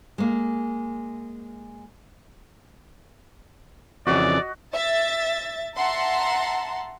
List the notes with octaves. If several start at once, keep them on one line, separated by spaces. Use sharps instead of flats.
G#3 A#3
F2 C#3 E3 F#4 D5 D#5
E5 A6
E5 F#5 A5 A#5 C6